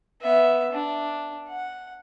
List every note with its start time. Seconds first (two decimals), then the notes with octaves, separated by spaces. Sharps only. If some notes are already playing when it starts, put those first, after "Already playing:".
0.22 B3 E5
0.72 D4
1.48 F#5